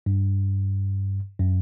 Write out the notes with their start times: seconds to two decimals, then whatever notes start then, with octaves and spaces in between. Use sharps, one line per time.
0.06 G2
1.39 F#2